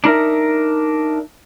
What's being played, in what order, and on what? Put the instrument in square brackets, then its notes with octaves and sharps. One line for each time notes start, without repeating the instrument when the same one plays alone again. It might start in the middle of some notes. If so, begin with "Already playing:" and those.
[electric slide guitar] D4 D#4 A#4 E5